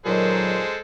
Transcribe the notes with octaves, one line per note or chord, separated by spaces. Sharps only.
A#2 D#3 F#3 G#3 A4 C5